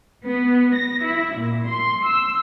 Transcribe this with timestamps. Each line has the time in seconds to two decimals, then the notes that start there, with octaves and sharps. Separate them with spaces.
0.24 B3
0.75 A#6
1.05 E4
1.37 A#2
1.68 C6
2.06 E6